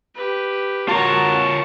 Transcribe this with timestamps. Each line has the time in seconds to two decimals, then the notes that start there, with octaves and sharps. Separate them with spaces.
0.15 G4 B4
0.88 F4 F#4 A#4 C#5 A5 A#5